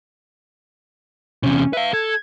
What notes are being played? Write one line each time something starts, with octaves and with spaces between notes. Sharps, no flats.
E2 C3 C#4
B4 E5 F5
A4 G#6